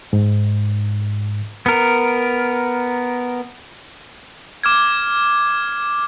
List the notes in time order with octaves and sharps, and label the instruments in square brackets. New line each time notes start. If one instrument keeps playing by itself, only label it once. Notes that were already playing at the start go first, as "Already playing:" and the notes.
[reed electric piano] G#2
[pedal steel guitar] B3 A#4
[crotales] D6 F6 G#6